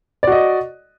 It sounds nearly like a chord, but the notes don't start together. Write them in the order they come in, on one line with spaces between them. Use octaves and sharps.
D5 F#4 D#5